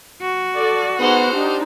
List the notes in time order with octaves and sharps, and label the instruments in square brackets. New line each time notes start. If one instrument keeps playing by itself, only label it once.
[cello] F#4
[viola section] A4 D5
[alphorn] B3 [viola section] D#4 G#4 F#5 [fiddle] C5 F6
[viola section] D4 D#4 [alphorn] G4